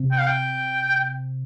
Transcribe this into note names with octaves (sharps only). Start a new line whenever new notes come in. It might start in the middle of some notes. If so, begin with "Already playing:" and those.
Already playing: C3 C4
G5
F5
G5